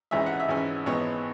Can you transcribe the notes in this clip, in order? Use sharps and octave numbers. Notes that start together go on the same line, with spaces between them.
G#1 G#2 E3 C#4 E5
F#5
E5
G#1 G#2 E3 C#4
G#1 G#2 E3 B3 C#5